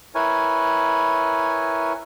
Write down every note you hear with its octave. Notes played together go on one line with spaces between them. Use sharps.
E4 A#4 B4 C#5 G#5